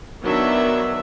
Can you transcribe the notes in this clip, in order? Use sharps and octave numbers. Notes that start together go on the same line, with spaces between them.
D#3 F#3 B3 D4 E5